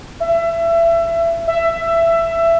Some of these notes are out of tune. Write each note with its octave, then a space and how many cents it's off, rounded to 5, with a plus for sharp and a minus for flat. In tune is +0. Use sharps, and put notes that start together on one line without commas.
E5 +25
E5 +15